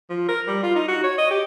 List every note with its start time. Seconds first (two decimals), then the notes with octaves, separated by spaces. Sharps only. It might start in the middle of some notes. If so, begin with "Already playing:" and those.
0.10 F3
0.29 A#4
0.47 G3
0.63 F4
0.76 D#4
0.88 F#4
1.03 C#5
1.18 D#5
1.31 G4